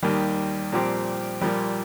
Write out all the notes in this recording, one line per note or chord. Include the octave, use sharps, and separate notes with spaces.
D#2 D#3 G3 A#3 G4
A#2 F3 C4 G4
A#2 F3 G3 A#3